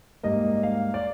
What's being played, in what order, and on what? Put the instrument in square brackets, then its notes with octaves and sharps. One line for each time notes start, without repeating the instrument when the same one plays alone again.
[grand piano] G#2 G3 A#3 D#5
F5
D5